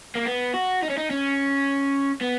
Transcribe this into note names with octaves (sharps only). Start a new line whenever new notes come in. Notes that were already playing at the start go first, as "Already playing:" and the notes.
A#3
B3
F#4
D#4
C#4
D#4
C#4
B3